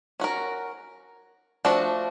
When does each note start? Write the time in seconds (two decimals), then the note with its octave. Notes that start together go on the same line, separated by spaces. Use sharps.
0.20 C#4 F#4 A#4
1.65 F3 A3 D4 F#4